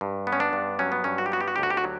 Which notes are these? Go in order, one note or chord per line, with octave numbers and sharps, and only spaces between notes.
G2
B3
C#4
D4
G2
F#3 C#4
B3
G2 C#4
F#4
G4
B3 F#4
G4
F#4
D2 G4
F#4
G4
F#4
F#3